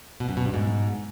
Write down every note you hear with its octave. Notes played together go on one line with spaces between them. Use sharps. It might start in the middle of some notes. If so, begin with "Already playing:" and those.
B2
F#2
B2
G2
G#2